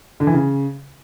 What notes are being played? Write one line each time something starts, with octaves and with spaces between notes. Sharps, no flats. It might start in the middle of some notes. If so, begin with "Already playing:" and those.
D3
E3
C#3